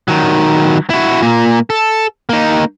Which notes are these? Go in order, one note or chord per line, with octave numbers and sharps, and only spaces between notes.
D#3 F#3
E4 F#4
A#2 A#3
A4
A#3 D#4